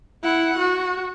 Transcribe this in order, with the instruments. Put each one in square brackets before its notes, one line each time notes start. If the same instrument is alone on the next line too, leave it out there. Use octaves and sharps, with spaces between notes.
[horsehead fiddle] E4 F#5
F#4